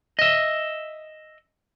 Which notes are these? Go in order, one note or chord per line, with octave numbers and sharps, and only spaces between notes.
D#5 E5